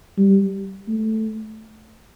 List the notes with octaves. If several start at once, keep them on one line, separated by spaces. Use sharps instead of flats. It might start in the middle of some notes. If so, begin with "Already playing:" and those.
G3
A3